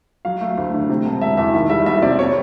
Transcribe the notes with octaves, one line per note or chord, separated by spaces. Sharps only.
F#3 F5
A3
D2
D3
C3
E1
E1 E5
E2 E5
D#3 E5
G3 E5
C2 E5
C3 D5
C3 C#5